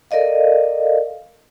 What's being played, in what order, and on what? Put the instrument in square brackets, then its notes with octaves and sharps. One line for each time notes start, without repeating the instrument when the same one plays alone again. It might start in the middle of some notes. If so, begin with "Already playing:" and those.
[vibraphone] A4 A#4 D5 D#5 F5